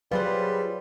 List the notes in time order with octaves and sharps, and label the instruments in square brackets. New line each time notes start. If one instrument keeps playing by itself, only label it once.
[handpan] F#3 B4 [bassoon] G3 [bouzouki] F4 G#4 C5